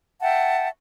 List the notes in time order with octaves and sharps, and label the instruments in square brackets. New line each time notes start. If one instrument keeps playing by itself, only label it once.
[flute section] E5 F#5 G5 A5